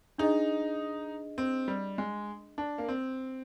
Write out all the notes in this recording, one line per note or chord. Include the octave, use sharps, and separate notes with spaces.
D4 D#4 G#4 D#5
C4
G3
G#3
D4
A#3
C4